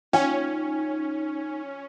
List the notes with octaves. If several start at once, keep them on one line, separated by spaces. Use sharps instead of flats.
C#4 D#4 G#5